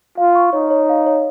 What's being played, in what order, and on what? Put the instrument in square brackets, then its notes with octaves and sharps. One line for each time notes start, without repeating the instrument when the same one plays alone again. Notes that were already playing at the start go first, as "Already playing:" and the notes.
[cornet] F4 [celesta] F5
[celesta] C#6
[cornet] D#4 [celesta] C#5
[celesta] C#5
F5
C#5